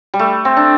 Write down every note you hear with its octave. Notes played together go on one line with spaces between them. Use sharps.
G3
A3
C4
D4